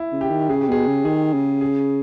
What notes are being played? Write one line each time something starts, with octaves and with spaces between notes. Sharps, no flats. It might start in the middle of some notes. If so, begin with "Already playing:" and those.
Already playing: E4
C#3
G4
D#3
C#3 G#4
G4
B2 G#4
C#3
D#3 G#4
C#3
G#4